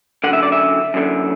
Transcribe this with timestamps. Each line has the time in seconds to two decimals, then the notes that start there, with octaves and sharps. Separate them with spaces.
0.24 F#2 D3 F#5
0.33 E5
0.43 D5
0.52 E5
0.94 F#2 D3